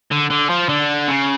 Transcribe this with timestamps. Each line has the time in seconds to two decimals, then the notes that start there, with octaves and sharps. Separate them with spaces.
0.12 D3
0.30 D3
0.49 F3
0.69 D3
1.08 C#3